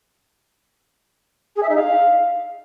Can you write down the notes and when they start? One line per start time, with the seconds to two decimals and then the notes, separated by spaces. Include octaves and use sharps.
1.55 G#4
1.62 E5
1.69 D#4
1.75 F5